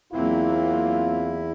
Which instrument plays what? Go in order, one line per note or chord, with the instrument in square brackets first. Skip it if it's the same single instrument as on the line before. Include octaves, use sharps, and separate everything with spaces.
[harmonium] E2 E4 [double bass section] F#3 A#3 C4 [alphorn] F4